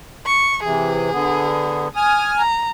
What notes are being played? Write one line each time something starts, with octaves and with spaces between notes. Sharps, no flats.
C#6
C3 E3 G#4
D3 B3
G#5 D#6 F6
A#5